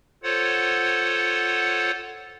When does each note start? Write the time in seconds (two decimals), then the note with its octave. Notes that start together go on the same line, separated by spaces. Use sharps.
0.23 F4 A4 C5 C#5 F#5